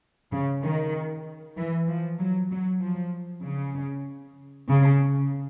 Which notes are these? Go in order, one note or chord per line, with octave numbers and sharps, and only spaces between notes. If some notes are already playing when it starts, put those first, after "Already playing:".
C#3
D#3
E3
F3
F#3
F#3
F3
C#3
C#3